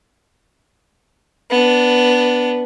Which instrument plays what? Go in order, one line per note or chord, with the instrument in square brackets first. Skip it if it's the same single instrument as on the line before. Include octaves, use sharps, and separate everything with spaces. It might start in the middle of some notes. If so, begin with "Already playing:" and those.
[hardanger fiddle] B3 D4